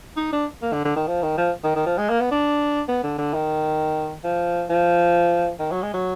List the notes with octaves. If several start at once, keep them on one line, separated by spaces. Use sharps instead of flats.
D#4
D4
A#3
D3
D3
D#3
F3
D#3
F3
D#3
D#3
F3
G#3
A#3
B3
D4
B3
D3
D3
D#3
F3
F3
D#3
F#3
G#3
F#3